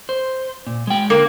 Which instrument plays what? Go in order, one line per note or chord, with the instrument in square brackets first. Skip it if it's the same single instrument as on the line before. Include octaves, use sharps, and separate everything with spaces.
[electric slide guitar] C5
A#2
G#3 G5
[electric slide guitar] D3 [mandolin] A#3